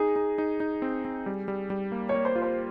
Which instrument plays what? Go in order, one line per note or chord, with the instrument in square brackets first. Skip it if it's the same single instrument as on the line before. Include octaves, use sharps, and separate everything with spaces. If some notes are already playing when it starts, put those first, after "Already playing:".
Already playing: [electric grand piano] D#4 [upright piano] G#4
[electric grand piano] D#4
D#4
D#4
C4
C4
G3
G3
G3
A#3
[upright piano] C#5
[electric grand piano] A#3
[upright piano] C5
[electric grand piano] F4
[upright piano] C5